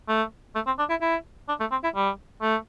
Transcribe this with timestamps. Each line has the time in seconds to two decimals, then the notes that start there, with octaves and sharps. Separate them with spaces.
0.09 A3
0.55 A3
0.67 C4
0.79 D4
0.90 E4
1.01 E4
1.49 D4
1.60 A3
1.72 C4
1.84 E4
1.96 G3
2.42 A3